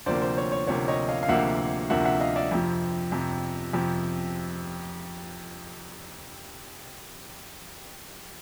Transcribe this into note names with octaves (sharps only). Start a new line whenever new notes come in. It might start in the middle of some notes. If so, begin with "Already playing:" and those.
D2 C3 F3 A#3 C5 D5
C5
C#5
C#5
D2 C3 F3 A#3 C#5
C#5 D#5
D#5 F5
F5
D2 C3 F3 A#3 E5 F#5
D2 C3 F3 A#3 E5 F#5
E5 F#5
D#5 F5
D5 E5
F2 C3 F3
F2 C3 F3
F2 C3 F3